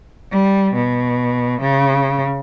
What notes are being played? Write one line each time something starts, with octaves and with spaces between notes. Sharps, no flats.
G3
B2
C#3